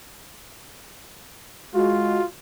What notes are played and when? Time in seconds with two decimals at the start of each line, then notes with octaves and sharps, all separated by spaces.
1.74 G#3 F4 F#4